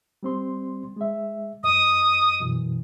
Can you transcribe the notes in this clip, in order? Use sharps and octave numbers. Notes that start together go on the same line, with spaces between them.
G3 C4 C6
G#3 E5
F#2 D#5 D#6
F#2 B2 E3